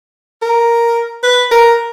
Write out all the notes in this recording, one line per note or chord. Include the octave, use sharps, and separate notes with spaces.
A#4
B4
A#4